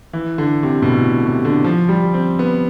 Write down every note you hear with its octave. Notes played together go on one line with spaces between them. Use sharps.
E3
D3
C3
B2
A2
C3
D3
F3
G3
C4
B3